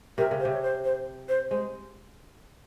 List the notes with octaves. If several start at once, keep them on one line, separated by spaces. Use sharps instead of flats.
C3 A#4
C#3
C5
C3
C#5
C5
C5
C5
G#3 C5